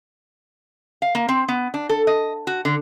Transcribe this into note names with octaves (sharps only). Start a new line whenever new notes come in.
F5
A#3
C4
B3
D4
A4
D#5
F#4
D3